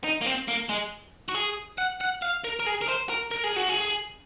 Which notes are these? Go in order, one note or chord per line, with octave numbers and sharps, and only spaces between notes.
D#4
A#3
C4
A#3
G#3
F#4
G#4
F#5
F#5
F5
A#4
A#4
G#4
A#4
C5
A#4
A#4
G#4
F#4
G#4